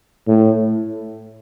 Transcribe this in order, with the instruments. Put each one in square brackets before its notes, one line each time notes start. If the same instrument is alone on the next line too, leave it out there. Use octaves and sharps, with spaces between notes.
[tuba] A2